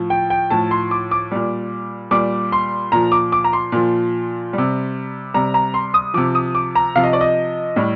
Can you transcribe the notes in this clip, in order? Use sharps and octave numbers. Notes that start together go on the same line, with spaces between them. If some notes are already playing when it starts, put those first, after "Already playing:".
Already playing: A2 F3
G5
G5
A2 F3 A5
C6
D6
D6
A#2 G3
A#2 G3 D6
C6
A#2 F3 A#5
D6
D6
A#5
C6
A#2 F3
C3 G3
C3 G3 A#5
A#5
C6
D#6
C3 F3 D6
D#6
D6
A#5
C3 F3 F5
D#5
D5
D#5
A2 G3